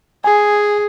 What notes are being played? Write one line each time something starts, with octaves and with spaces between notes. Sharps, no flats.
G#4 G#5